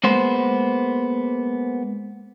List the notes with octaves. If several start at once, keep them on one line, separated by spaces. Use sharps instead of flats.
G#3 A#3 B3 C5